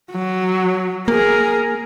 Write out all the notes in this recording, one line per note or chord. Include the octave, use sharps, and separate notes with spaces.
F#3
A#3 G#4 A#4